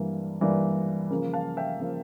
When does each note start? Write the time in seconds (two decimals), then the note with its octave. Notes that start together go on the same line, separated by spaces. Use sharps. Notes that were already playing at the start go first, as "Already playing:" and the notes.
Already playing: G2 E3 G3 A#3
0.41 G2 E3 G3 A#3
1.10 C#3 F3 A#3 A#4
1.33 F5 A5
1.57 E5 G5
1.80 C#3 F3 A#3